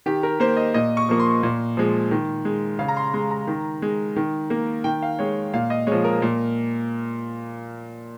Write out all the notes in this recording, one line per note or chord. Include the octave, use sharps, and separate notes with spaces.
D#3 G4
A#4
A#3 C5
D#5
A#2 D#5
C#6
F3 A#3
C6
A#2
F3 G#3
D#3
G#3
C#3 F5
A#5
C6
G#3 C6
A#5
D#3
G#3
D#3
A#3
D#3 G5
F5
G#3 C#5
A#2 F5
D#5
F3 G#3 C#5
A#4
A#2